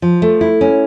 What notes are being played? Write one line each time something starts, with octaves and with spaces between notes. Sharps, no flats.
F3
A3
E4
C#4